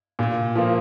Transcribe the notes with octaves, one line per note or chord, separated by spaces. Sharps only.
A#2
F3 A#3